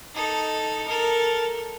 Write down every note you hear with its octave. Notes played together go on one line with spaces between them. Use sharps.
D#4 A4
A4 A#4